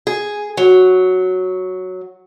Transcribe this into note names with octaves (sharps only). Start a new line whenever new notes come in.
G#4
F#3